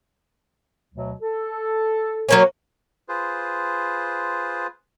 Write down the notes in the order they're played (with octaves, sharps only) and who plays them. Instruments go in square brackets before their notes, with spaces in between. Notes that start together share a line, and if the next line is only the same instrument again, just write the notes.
[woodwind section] D2 B2 F#3
A4
[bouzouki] F#3 A#3 C#4
[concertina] F4 G#4 B4 C5